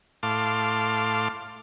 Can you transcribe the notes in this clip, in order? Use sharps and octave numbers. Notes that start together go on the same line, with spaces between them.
A2 F5 A5 C6 D6